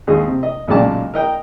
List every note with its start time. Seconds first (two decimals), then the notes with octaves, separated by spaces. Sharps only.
0.07 D#2 G#3 G#4 D#5
0.26 C3
0.43 D#5
0.68 B1 A#2 C#3 G#3 D5 A5
1.14 A#4 D#5 G5